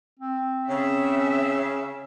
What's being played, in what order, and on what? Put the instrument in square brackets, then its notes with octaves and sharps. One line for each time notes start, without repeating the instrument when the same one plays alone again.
[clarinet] C4
[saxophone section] C#3 [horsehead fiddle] C#4 E5